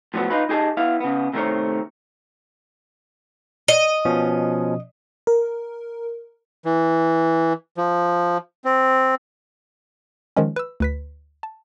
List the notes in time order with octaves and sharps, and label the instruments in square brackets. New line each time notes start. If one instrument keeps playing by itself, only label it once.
[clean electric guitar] A2 F3 F#3 B3
D#4 F4 B4
D#4 G4 G#4 D#5 A5
B3 E4 F5
C#3 B3
C3 D#3 A3 A#4 C5 C#5
[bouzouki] D#5
[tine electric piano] B2 F3 C#4
[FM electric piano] A#4
[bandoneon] E3
F3
C4
[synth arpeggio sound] D#3 F3 G#3 C#4
B4 E6
D2 B4 B6
A5